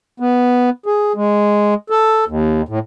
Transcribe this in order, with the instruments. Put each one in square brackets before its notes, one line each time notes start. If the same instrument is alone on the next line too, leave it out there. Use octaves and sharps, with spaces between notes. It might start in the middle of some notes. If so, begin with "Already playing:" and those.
[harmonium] B3
G#4
G#3
A4
D#2
A2